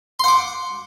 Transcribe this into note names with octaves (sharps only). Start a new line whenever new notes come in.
F#5 C6 D6